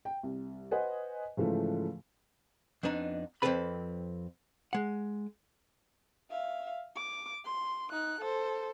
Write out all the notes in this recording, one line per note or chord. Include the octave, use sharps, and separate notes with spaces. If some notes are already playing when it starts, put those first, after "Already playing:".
G5
C2
B4 C5 D#5 F#5 G#5
G#2 C#3 E3 F3 G#3 A3
F2 B3 D4 D#4
F2 G#2 C4 A4 B4 B5
G#3 F#5
E5 F5
D6
C6
D#4 F#6
A4 C5